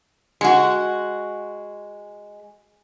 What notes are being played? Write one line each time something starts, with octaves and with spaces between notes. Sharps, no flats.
G#3 F#4